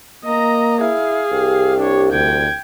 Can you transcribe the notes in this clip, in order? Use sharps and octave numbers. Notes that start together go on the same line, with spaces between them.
A#3 D#5 A#5
E4 G#4 F5
C2 G4
D4 C#5
D2 G5 G#6